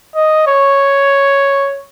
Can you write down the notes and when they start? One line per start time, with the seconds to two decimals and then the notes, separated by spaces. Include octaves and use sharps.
0.15 D#5
0.47 C#5